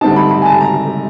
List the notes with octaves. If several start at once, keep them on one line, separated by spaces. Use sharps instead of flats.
D3 G3 C4 D#4 A5
B5
B5
G#5
A5
A#5